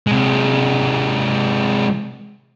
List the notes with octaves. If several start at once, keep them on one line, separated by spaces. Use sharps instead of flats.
C3 G#3